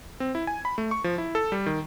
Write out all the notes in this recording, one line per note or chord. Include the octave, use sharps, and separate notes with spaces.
C4
E4
G#5
B5
A3
C#6
F3
E4
A4
G3
D#3